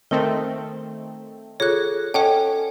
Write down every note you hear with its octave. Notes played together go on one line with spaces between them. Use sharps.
D#3 A3 C4 A#4
F4 G#4 A4 C#5 F#6
C#4 A4 C#5 D#5 F#5 G5 A5